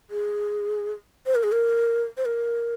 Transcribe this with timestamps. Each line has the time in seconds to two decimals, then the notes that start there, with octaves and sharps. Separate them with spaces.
0.10 G#4
1.26 C5
1.35 A#4
1.43 G#4
1.52 A#4
2.17 C5
2.25 A#4